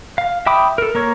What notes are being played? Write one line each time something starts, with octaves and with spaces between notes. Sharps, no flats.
F5
E5 G5 B5 D6 D#6
A4 A#4
A#3 A#4 C#5